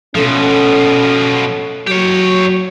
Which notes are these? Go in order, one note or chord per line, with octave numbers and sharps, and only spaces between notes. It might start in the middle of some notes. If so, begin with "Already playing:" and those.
B2 F3 A3 C#4 A4
F#3 G4 C#5